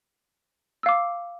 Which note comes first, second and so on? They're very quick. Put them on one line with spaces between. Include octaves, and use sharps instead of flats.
E6 F5 D6